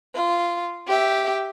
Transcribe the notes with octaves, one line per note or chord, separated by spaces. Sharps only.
F4
G4 E5